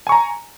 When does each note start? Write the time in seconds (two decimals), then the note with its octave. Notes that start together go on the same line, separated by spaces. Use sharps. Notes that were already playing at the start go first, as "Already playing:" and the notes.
0.07 G#5
0.09 C#6
0.12 A#5